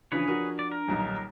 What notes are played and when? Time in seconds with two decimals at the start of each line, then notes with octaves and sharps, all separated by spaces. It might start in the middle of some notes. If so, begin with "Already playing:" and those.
0.12 C#3 E3 F3 D4 G#4 B4 C#5
0.28 F3 F#4 A#4
0.59 D5
0.72 A#4
0.88 D#1 B1 D#4